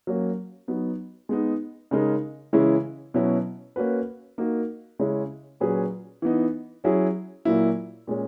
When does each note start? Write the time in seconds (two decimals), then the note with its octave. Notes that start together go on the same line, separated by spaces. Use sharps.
0.07 F#3 A#3 C#4
0.68 F#3 B3 D#4
1.29 G#3 B3 D#4
1.91 C#3 G#3 D#4 A#4
2.53 C#3 E3 G#3 C#4 E4
3.14 B2 F#3 C#4 E4
3.76 A#3 C#4 F#4 B4
4.38 A#3 D#4 F#4 A#4
4.99 C#3 G#3 C#4 E4
5.60 A#2 F#3 C#4 G#4 B4
6.22 E3 B3 D#4
6.84 F#3 C#4 E4 G#4
7.45 A#2 F#3 A#3 E4
8.07 A#2 G#3 C#4